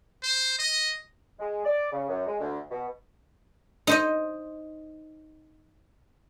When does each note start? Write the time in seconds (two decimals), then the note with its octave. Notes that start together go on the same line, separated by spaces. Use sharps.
0.23 C5
0.59 D#5
1.39 G#3
1.64 D5
1.92 C#3
2.09 F#2
2.26 G#3
2.40 D2
2.70 B2
3.87 D#4 C5 D#5